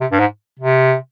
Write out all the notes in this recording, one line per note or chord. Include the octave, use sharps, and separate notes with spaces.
C3
G2
G#2
C3